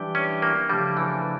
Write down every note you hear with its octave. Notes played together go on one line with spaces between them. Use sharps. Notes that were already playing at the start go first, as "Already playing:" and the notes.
Already playing: E3 G3 D4 G4
C#4
A#3
C#3 F3 G3 A3 D4
E3